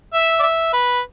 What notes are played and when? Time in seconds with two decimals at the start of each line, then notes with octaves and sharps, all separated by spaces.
0.14 E5
0.39 D5
0.43 E5
0.73 B4